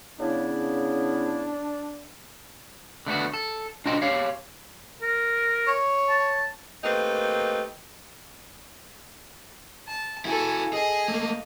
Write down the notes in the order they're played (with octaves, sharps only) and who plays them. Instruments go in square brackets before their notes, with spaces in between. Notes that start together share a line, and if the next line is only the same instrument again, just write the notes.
[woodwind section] C#3 B3 E4 [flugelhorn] D4
[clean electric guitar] D3 A3 B3 F#4
A4
D4 F4 F#4 C5 D#5 G5
G4 C#5 F5
[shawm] A#4
[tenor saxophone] C#5
[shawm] A5
[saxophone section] A3 A#3 C4 D#4 G4 B4
[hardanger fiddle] A5
[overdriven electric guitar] E4 F#4 [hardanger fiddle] A4 G#5
[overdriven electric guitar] G#4 G#5 [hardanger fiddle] D#5
[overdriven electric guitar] A3 A#3